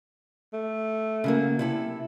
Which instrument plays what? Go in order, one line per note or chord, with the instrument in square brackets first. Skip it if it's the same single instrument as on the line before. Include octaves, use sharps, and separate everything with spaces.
[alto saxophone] A3
[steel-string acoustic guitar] C#3 F#3 A#3
C3 E4 A4